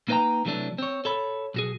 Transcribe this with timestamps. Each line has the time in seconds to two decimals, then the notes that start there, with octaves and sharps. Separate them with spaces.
0.08 A#3 D#4 B4 D5 G5 A#5
0.45 C3 E3 F#3 A3 B3 D4
0.78 C4 C#5
1.05 A4 C#5 B5
1.54 B1 F#4 G#4